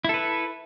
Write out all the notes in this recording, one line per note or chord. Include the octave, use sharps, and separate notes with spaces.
E4 A4 B4